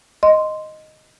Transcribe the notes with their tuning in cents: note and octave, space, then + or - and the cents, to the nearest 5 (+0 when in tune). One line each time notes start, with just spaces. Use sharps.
D#5 +0 C6 -5